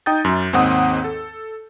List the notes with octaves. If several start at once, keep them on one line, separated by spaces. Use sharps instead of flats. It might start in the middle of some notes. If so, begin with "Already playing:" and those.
D#4 G5 D#6 G6 A6
F#2
D#2 G#2 C4 D#4 F#5 D#6
A4